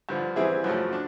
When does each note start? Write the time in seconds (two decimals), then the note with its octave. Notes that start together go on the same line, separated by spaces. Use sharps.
0.09 G2 D3 F3
0.36 E3 G3 C4 E4 G#4
0.64 F#2 C#3 F3 A3
0.93 D4